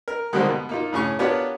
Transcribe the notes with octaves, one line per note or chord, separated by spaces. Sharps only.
A#4
D3 D#3 G3 G#3 A#3 C4
B2
A#3 D#4 F4
A2 C#3 G#5 C#6
B3 D4 F4 G4 A#4 C#5